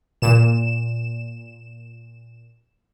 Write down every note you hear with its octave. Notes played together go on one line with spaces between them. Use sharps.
A#2 E7